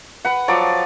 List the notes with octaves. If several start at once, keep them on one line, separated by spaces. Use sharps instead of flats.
B4 F#5
F3 F#3 D5 D6